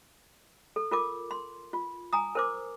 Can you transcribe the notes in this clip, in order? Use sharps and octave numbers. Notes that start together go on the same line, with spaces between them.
A4
F4 A#4 D6
C6
F4
G#5 A#5 D#6
A#4 C5 D6